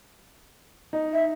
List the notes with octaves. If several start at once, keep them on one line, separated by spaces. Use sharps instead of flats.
D#4
E5